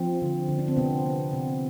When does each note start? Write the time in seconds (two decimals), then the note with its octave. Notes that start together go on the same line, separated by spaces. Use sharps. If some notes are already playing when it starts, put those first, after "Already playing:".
Already playing: F3 C4
0.22 D3
0.49 D3
0.59 D4
0.68 C4
0.77 C3 B3
1.06 B3
1.33 C3